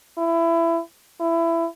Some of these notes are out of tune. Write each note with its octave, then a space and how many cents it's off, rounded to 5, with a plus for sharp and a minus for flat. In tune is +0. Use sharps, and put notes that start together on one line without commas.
E4 +20
E4 +20